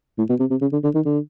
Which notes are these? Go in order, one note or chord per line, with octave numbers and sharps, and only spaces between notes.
A2
B2
C3
C3
C#3
D3
D3
D#3
D3